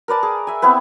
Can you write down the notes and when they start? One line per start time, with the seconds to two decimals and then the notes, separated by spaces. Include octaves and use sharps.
0.08 A#4 B4 D5 A5
0.23 G#4
0.47 E5 G#5
0.62 B3 C4 E4 B4